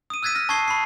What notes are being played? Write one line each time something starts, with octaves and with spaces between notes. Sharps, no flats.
D#6 D#7
E6 F#6 G#6 A6 B6 D#7
F6 A#6
A5 C#6 D#6 G#6 C7 G7
B5 C7